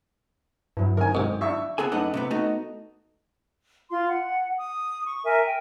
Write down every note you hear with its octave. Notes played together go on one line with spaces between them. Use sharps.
G2 F#3 E4
D3 D#3 C4 A#4 G#5
G#2 C3 C4
D4 E4 E5 C#6
B3 G#4 A4 G#5
F#2 A3 B3 D4 D#4 F#5
C3 A3 B3
A3 B3 D#4 F#4
F4 C6
F#5
D#6
C#6
A#4 E5 G#5
G5